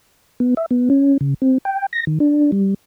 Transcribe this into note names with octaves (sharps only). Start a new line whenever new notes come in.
B3
E5
B3
C#4
C#3
C4
G5
A#6
D#3
D4
G3